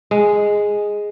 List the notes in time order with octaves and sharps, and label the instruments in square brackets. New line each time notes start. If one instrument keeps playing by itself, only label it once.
[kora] G#3